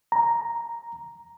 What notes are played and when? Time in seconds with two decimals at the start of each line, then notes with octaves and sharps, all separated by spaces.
0.12 A#5